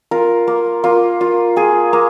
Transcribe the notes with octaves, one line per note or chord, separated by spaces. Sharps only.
F4 A#4
A#3
A#3 F4
F4
F4 G#4
A#3